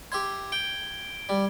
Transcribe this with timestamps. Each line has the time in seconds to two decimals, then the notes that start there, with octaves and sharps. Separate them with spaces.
0.12 G4 E5 C6 G#6
0.52 G5 D7 G7
1.29 G3